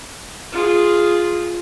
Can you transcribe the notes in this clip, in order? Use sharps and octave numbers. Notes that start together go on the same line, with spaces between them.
F4 G#4